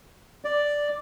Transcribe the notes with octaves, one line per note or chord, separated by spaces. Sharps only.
D5